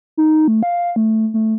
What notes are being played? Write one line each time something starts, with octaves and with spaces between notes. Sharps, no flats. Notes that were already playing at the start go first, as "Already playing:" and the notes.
D#4
A3
F5
A3
A3